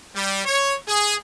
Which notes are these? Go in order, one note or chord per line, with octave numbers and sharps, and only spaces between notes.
G3
C#5
G#4